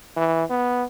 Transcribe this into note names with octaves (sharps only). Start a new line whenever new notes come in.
E3
B3